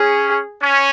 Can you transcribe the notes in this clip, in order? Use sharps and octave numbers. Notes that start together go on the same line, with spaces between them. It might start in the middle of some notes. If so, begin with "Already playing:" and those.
Already playing: C#4 G#4
C#4